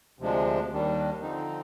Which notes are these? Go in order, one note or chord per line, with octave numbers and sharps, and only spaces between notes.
D2 C3 F3 G#3 D4
D#2 D#3 G3 D4
D3 F3 C4 D#4